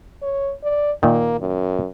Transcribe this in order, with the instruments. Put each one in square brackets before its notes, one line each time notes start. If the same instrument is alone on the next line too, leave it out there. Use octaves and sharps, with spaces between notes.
[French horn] C#5
D5
[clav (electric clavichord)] A#2 D#3 [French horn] A#3
[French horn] F#2